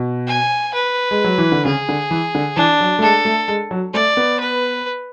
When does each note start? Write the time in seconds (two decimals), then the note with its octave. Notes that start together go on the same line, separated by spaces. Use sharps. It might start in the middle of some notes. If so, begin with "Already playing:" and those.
Already playing: B2
0.28 G#5
0.74 B4
1.11 G#3
1.24 F#3
1.38 E3
1.52 D3
1.65 C#3 G#4
1.89 D3
2.11 E3
2.35 D3
2.56 E3 D4
2.80 F#3
2.99 A3
3.02 G#3 A4
3.25 A3
3.48 G#3
3.71 F#3
3.94 A3 D5
4.17 B3
4.40 B4